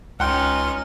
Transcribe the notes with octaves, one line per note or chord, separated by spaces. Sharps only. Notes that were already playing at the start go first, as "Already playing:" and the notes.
C#2 C#4 D#4 F#5 G5 C6 F6